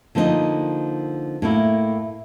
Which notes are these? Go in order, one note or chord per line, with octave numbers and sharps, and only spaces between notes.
D3 F3 A#3 C4 D#4
A2 A#3 E4